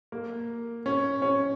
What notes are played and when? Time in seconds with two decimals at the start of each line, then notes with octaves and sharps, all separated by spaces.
0.12 A#3
0.86 C#4
1.22 C#4